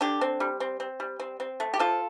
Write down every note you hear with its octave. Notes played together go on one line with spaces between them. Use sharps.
D3 D4 G4
C4
G3
C4
C4
G3
C4
C4
A3
G4
F3 F4 A4